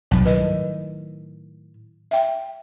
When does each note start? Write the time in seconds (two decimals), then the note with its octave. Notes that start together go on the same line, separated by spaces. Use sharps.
0.11 B1 G2 F3 F#3
0.25 A2 D#3 B4 D#5
2.11 E5 G5